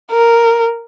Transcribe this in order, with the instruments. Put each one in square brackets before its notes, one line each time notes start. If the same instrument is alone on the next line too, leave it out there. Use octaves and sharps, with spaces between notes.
[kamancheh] A#4